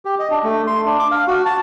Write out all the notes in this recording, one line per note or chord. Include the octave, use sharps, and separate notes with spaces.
G4
D#5
D4
A3
C6
D4
D6
F5
F#4
A5